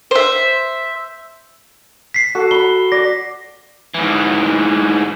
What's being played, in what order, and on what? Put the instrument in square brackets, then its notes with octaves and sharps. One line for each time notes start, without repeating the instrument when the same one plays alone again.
[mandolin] C5 E5
[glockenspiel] B6 C7
[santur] F#4 A4
[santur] B5 [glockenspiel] G7
[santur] D5 [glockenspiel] A#6
[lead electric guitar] G#2 E3